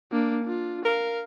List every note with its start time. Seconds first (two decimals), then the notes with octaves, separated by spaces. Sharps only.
0.12 A#3 D4
0.44 D4 F4
0.85 A#4 F5